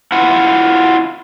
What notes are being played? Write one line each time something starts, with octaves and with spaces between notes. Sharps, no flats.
E4 F4 F#5